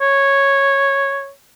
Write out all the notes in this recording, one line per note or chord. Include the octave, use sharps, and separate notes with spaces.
C#5